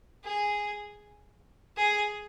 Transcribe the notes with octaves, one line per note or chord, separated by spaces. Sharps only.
G#4
G#4